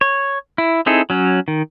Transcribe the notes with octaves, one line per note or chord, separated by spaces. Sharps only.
C#5
E4
C4 D#4 E4 G#4 A4
F#3 C#4
D#3